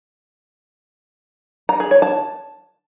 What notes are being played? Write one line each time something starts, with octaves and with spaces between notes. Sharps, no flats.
A#5
G#4
C#5
A5